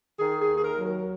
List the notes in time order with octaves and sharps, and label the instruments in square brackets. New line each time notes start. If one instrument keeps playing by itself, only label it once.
[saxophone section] D#3 G#4
G#4
D#2
G#4
A#4
F#3
A#4